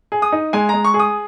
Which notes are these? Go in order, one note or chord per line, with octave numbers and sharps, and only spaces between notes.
G#4
D#6
D#4
G#3 G#5
G#3 A#5
C#6
G#4
D#6